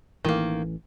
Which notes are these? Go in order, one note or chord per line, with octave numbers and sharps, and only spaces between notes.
A1 D#3 E3 A3 A#3